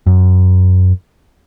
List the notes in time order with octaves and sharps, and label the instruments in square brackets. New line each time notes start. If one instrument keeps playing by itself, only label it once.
[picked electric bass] F#2